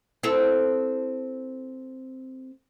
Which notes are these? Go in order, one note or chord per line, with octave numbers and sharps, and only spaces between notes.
C4 E4 A4